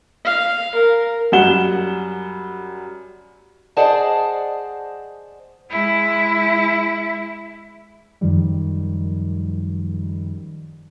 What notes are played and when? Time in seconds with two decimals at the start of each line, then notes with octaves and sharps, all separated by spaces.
0.25 F5
0.75 A#4
1.32 F#2 G3 F#5 E7 G7
3.77 G#4 C5 D5 D#5 F#5 A5
5.70 G#3 E4
8.21 F#2 D#3 F3 G3